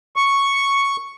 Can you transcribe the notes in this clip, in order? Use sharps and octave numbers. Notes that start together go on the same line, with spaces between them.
C#6